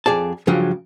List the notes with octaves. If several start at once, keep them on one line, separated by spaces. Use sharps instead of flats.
F2 G#4 D5 A5
G2 C#3 F3 F#3